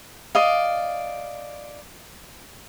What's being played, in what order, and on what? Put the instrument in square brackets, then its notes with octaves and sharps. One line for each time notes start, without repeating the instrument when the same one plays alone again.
[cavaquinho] D5 D#5 F5